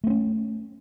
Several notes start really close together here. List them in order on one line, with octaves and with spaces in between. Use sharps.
A3 C4 C#4